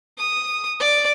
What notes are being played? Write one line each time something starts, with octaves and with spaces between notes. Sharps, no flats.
D#6
D5